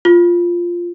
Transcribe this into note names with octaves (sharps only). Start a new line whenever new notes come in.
F4